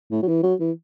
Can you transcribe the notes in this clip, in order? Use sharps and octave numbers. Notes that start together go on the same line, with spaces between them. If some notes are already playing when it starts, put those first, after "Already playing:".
A2
F#3
E3
F#3
E3